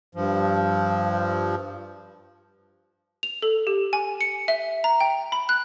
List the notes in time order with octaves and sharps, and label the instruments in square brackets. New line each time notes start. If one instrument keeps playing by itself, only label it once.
[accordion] G2 F3
[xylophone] F7
A4
G4
G#5
C#7
E5
A#5
G5
B5
F#6